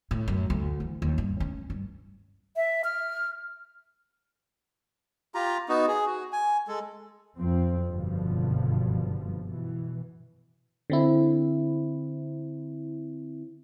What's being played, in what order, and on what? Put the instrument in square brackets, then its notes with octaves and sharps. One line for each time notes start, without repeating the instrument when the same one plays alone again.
[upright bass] A2
F#2
D2
E3
D#2
G2
C#4
G2
[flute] E5
F6
[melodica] F4 G4 A#5
B3 D#4 F#4
G#4
F#4
G#5
G#3 A4
[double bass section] F2 F3 C4
F#1 G2 B2 D3 F3
B2 E3
[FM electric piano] D3 C4 E4